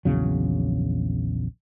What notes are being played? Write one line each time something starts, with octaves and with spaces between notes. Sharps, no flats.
A#1 E2 C#3 F#3